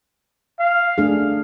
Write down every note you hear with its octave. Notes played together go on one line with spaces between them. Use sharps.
F5
A3 D4 G#4